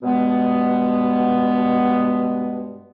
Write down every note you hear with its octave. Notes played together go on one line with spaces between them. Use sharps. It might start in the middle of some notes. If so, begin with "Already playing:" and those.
G2 B2 G#3 B3